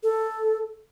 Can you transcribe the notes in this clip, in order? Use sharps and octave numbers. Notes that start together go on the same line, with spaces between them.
A4